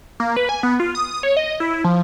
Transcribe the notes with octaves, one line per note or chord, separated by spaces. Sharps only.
A#3
B4
G#5
B3
F4
D#6
C#5
D#5
E4
F3